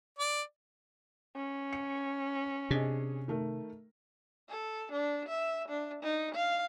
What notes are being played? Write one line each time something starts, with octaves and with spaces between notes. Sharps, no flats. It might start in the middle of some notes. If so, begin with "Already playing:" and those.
D5
C#4
C#7
C3 D4 G#4 D#5
D#3 A3 A#4
A4
D4
E5
D4
D#4
F5